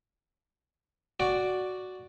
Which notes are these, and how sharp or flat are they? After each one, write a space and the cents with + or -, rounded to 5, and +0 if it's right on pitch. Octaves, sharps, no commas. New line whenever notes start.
F#4 +0 D5 +0